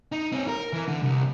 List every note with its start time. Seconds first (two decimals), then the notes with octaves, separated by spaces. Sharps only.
0.12 D#4
0.32 C4 C#5
0.48 A#4
0.73 E3
0.88 D3
1.02 C2